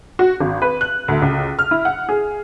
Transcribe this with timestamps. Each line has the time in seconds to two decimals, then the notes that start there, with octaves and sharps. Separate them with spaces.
0.19 F#4
0.40 G#1
0.62 B4
0.81 F#6
1.08 D2
1.22 C#2
1.59 F6
1.71 E4
1.85 F#5
2.09 G#4